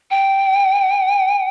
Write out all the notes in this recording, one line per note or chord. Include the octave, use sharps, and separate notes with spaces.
G5